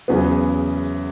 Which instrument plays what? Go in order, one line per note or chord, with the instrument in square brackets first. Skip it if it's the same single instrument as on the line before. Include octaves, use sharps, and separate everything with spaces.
[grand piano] E2 C#3 F#3 B3